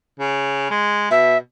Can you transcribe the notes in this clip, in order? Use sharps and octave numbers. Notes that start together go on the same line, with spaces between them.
C#3
G#3
B2 E5